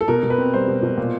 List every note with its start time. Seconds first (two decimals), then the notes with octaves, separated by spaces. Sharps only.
0.01 A4
0.08 B2 A#4
0.23 B2
0.30 B4
0.38 C4
0.53 G3 C5
0.68 B2
0.83 B2
0.97 A#2